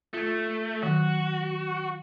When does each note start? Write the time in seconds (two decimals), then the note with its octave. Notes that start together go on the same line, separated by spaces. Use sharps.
0.14 A3 F4 G#6
0.83 D#3 F#3 F#4